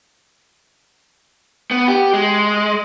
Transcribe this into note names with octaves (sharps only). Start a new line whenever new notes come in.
B3
G4
G#3